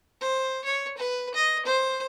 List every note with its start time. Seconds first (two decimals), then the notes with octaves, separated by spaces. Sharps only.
0.21 C5
0.65 C#5
0.97 B4
1.35 D#5
1.66 C5